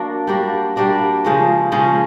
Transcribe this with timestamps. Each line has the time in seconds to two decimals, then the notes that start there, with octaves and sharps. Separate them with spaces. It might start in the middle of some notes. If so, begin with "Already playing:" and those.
Already playing: F#3 A#3 D4 F#4
0.27 G3 A#3 D4 F#4
0.76 G3 A#3 D4 F#4
1.25 C#3 F3 G#3 C#4
1.72 C#3 F3 G#3 C#4